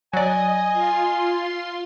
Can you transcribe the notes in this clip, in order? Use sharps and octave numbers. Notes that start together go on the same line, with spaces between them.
F#3 D5 D#5 G#5
F4 C6